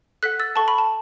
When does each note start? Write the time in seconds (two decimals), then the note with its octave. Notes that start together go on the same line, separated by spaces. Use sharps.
0.23 A4 F#5 F#6 B6
0.40 E6 A6
0.56 A4 F#5 A5 C#6
0.68 B5
0.78 A5